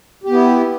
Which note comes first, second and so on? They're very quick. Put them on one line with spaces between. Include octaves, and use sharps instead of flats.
G4 B3 E4